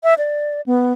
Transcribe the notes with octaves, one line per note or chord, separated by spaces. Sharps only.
E5
D5
B3